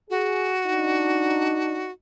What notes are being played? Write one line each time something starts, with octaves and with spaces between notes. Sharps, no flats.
F#4 G#4
D4 D#4